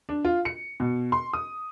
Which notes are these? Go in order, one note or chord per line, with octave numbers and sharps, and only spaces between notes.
D4
F4
C#7
B2
C6
D#6